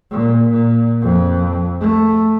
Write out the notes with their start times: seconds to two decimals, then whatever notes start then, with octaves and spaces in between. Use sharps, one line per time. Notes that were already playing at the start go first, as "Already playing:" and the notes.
0.11 A#2
0.50 A#2
1.02 F2
1.80 A3